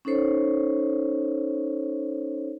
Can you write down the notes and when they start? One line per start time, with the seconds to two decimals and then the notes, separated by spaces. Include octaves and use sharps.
0.05 C#4 D#4 A4 C5 C#5